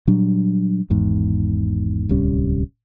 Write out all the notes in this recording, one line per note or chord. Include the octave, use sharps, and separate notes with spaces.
A#2 F#3 G3 D4
G#1 E2 G#2
D1 C2 G3 C#4